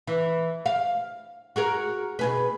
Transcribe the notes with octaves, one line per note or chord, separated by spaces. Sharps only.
E3
F5
F#4 G#4 A#4
B2 G#4 B4